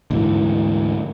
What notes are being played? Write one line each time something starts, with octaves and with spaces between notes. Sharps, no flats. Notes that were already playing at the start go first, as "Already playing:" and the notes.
D2 G#2 E3